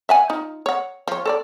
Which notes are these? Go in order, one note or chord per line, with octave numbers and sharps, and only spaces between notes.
E5 F#5 G#5
D#4 F4
C#5 F#5
F3 C#5
A4 C#5 D5